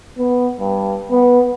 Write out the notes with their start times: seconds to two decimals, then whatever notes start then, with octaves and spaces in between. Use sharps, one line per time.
0.18 B3
0.60 G2
1.11 B3